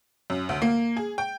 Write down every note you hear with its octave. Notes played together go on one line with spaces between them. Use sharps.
F#2
D2
A#3
G#4
G5